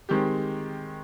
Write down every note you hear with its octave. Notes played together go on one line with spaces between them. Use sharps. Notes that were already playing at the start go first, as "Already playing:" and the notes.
D#3 G#3 C4 G4